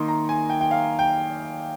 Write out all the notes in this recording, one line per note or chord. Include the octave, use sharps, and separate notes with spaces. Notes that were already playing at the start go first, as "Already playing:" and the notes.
Already playing: D#3 A#3 D#4 C6
A#5
G#5
G5
G5
F5
G5